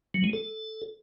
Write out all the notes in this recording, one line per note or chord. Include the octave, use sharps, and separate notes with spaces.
F#3
G#3
A4